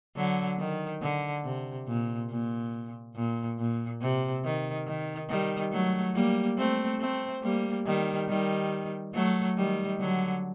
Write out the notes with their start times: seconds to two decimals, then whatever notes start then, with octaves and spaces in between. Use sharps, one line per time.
0.16 D3 F#3
0.59 D#3
1.02 D3
1.44 C3
1.88 A#2
2.30 A#2
3.16 A#2
3.58 A#2
4.01 C3
4.44 D#3
4.87 D#3
5.29 D#3 G3
5.72 F#3 A3
6.15 G3 A#3
6.58 A3 C4
7.00 A3 C4
7.43 G3 A#3
7.86 D#3 G3
8.29 D#3 G3
9.15 F#3 A3
9.57 D#3 G3
10.00 D3 F#3